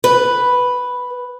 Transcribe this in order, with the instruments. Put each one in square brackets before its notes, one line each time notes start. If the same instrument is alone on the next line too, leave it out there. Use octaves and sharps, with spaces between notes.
[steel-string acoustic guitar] B4